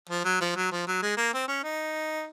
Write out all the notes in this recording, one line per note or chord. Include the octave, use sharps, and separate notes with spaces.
F3
F#3
F3
F#3
F3
F#3
G#3
A#3
C4
C#4
D#4